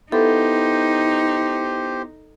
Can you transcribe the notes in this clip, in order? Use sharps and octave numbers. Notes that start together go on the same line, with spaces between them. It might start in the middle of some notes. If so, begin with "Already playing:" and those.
B3 D#4 E4 G4 A4 C5